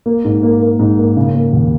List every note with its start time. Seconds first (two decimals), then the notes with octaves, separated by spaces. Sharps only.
0.06 A#3
0.25 G#2
0.43 A#3
0.62 A#3
0.79 G#2
0.98 A#3
1.17 C#3
1.35 A#3
1.53 D#2